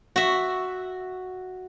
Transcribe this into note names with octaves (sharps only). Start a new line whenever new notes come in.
F#4 E5